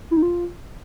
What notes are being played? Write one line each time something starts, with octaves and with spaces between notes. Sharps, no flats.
E4
D#4
F4